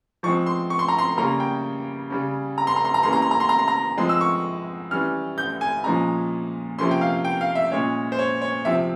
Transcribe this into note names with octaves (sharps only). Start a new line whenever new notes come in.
F3 G#3 C4 C#6
C6
C#6
C6
A#5
C6
C#3 G3 A#3 C#4 A#5
G5
C#3 G3 C#4
A#5
C6
A#5
C6
A#5
E3 G3 A#3 C#4 C6
A#5
C6
A#5
C6
A#5
C6
A#5
F3 G#3 C4 C6
E6
C#6
E3 G3 C#4 F6
G6
G#5
A#2 F3 G#3 C#4 A#5
C3 F3 A#3 C#4 C6
G5
F5
G5
F5
E5
A#2 G#3 C#4 C#5
C5
C#5
C#5
C3 F3 C4 E5